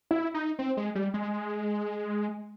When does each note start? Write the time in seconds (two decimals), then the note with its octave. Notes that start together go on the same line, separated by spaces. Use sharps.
0.11 E4
0.34 D#4
0.59 C4
0.77 G#3
0.95 G3
1.14 G#3